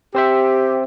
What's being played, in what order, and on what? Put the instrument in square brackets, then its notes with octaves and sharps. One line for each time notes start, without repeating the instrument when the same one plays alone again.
[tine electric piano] C4 C5 E5 [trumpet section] G4